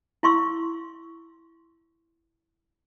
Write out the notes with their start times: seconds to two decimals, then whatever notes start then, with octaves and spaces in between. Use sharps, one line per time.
0.23 E4 F5 C6 C#6 E6